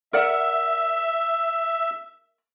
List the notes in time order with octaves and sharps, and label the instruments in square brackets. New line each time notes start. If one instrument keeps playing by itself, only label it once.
[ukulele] A#4 D5 F#5 [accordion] E5